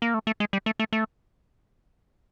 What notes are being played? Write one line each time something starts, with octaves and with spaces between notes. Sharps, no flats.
A#3
A3
A3
G#3
G3
A3
A3
A3